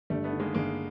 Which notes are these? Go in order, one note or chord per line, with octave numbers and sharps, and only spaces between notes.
G1 G3 A3
A3 B3
D#3
G#3 A#3
G1 G#3 A#3